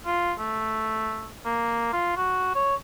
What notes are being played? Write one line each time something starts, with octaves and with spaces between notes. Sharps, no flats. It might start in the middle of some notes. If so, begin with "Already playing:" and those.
F4
A3
A#3
F4
F#4
C#5